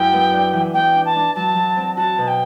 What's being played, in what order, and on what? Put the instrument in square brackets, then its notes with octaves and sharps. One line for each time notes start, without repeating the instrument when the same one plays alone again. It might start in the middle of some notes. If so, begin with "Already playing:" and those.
Already playing: [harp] F#2 F#3 E4 [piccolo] G5
[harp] B3
D4
E3
[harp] B3 [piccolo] G5
[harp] D4
[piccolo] A5
[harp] D4
[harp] F#3 [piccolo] A5
[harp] F#3
C4
[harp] F#4 [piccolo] A5
[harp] B2
[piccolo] G5